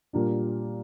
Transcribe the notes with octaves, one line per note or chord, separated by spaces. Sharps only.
A#2 G3 A#3 D4 F4